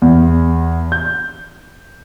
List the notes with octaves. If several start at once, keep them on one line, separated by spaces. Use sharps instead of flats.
E2
G6